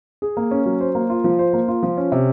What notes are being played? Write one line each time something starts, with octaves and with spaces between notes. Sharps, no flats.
G#4
A#3
C#4
F#3
C5
A#3
F4
F3
C5
A#3
F4
F3
C#4
C3